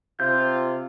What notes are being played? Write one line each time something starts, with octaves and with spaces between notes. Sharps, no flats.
C3 F4 G6